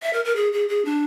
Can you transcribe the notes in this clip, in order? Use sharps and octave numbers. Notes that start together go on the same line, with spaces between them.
E5
A#4
A#4
G#4
G#4
G#4
D4